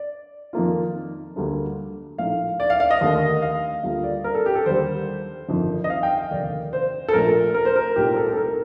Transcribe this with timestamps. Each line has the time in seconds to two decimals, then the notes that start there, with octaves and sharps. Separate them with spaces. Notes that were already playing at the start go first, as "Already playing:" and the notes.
Already playing: D5
0.53 F2 D#3 A#3 F4
1.36 D2 D3 G3 A#3 D4
2.18 A#1 A2 A3 D#4 F5
2.60 D5
2.70 F5
2.80 F5
2.91 D#5
3.01 D#2 D3 A3
3.42 F5
3.83 D2 D3 G3 A#3 F4 F5
4.04 D5
4.24 A#4
4.35 A4
4.46 G4
4.55 A4
4.66 D#2 D3 G3 C5
5.49 G1 F2 D#3
5.84 D#5
5.90 F5
6.03 G5
6.18 F5
6.31 F1 D#2 D3 D5
6.73 C5
7.08 A4
7.13 A#1 A#2 A3 A#4
7.54 A#4
7.65 C5
7.76 A#4
7.96 C2 A#2 A3 C4 D#4 G4
8.11 A#4
8.16 A4
8.33 A4
8.37 A#4